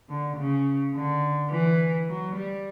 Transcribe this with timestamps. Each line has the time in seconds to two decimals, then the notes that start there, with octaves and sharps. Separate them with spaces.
0.10 D3
0.37 C#3
0.95 D3
1.51 E3
2.08 F#3
2.36 G3